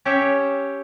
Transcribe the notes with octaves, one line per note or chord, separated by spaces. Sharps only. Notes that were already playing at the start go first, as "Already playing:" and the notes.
C#4 G4 C#5 E5